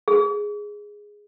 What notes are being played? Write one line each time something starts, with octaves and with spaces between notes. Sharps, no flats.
G#4